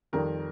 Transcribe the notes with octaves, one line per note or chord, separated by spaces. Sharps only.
F2 D#3 G3 A#4